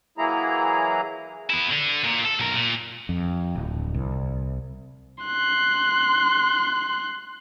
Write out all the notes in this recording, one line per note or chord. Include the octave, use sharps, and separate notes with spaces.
E3 F#3 A#3 E4 G#4 A#5
B3 E4
D3
A#2
A4
B1 A#4
A#2
F2
D1
C2
C6 F#6